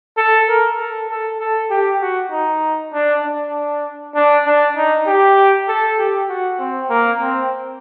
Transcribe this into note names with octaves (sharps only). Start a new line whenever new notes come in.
A4
A#4
A4
A4
A4
G4
F#4
D#4
D4
D4
D4
D4
D#4
G4
A4
G4
F#4
C4
A#3
C4